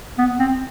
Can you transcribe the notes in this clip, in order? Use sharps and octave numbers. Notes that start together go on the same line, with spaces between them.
B3
C4